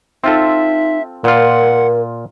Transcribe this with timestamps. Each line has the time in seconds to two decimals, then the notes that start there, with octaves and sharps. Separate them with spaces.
0.24 C4 D#4 F4 A4 E5
1.24 A#2 F4 A#4 F#5